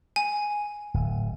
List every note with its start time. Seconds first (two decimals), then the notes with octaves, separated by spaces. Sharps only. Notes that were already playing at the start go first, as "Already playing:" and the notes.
0.16 G#5
0.94 D1